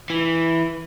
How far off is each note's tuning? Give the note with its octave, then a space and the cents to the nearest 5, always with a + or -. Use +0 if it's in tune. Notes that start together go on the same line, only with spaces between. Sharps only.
E3 +0